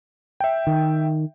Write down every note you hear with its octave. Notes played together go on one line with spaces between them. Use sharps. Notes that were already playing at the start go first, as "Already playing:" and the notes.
E5 G5
D#3